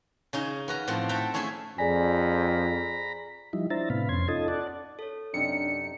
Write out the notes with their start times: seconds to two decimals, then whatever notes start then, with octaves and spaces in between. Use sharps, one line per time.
0.33 C#3 C#4 D#4 G#4
0.68 B3 F#4 A#5
0.88 A2 F3 A3 C4 F#5
1.09 A4 E5 F#5 G5 A5 A#5
1.34 A3 C#4 E4 G#4 E5
1.78 F2 G#4 D5 G#5 A#5 B5
3.53 F3 G3 D#4 E4
3.70 D4 E4 C5 E5 A#5 A6
3.90 A2 C3 B3 F5 B5
4.09 F2 C#4 C6 G#6
4.28 C#4 D#4 F4 A4 D#5 A5
4.48 D5 F#5 A5
4.99 A4 C#5
5.34 F#2 C3 D4 D#4 C#7